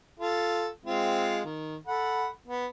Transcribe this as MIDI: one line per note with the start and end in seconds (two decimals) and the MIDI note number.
0.20 0.68 65
0.20 0.68 69
0.86 1.42 56
0.86 1.42 60
0.86 1.42 65
1.44 1.76 51
1.87 2.28 69
1.87 2.28 78
1.87 2.28 83
2.48 2.66 59